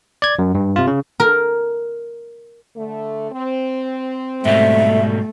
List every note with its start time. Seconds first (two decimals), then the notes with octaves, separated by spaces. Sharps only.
0.22 D5 G#6
0.39 F#2
0.55 G2
0.76 C3 F4
0.87 C#3
1.20 A#4
2.76 D3 A3
3.32 C4
4.45 G#2 B2 G3 A3 E5